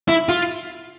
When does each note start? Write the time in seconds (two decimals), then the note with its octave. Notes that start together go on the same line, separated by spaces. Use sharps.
0.08 E4
0.29 F4